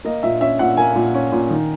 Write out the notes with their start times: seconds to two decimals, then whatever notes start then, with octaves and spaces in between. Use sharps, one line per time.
0.05 A#3 D#5
0.23 A#2 E5
0.41 C#4 E5
0.59 A#2 F#5
0.77 A#3 G#5
0.95 A#2
1.14 C#4
1.32 A#2
1.50 D#3